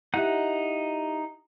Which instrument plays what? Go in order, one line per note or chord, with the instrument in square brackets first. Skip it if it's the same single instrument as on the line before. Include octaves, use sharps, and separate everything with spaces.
[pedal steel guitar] D#4 F#5 F#6 [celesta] E4 G4 E5